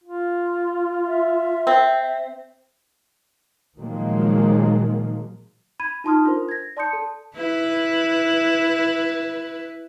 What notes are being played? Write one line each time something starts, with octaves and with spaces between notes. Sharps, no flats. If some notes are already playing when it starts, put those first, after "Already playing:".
F4
E5
C4
A#2 D#3 F3 F#3 G#3 A#3
B5 G#6 D#7
D#4 F4 A5 C6 D#6 F6
D4 F4 A4 A#4 C5
G#6 A#6
D5 A5 C6 D#6 G6 C#7
A4 A5
E4 B4